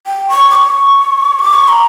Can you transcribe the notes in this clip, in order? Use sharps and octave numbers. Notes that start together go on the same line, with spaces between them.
G5
C#6
D6
C#6
D6
C#6
A#5